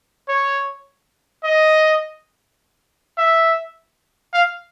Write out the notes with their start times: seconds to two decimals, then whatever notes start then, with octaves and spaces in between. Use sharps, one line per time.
0.28 C#5
1.44 D#5
3.18 E5
4.34 F5